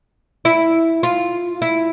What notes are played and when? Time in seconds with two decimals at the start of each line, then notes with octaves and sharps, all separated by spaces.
0.45 E4
1.03 F4
1.62 E4